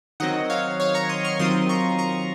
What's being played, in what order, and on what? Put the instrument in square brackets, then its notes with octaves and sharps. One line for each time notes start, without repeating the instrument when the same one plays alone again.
[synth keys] D#3 F#3 C4 D#5 F#5
C#5 F5
C#5 F5
A#5 C#6
C6 D#6
C#6 F6
D#3 F#3 C4 F4 C6 D#6
A#5 C#6
A#5 C#6